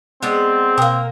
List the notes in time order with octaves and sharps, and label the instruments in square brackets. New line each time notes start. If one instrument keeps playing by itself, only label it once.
[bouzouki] G#3 B3 D5 [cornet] C4
[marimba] B2 G5 [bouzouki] A#3 A#4